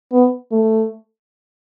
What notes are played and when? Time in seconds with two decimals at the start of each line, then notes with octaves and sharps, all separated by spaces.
0.12 B3
0.52 A3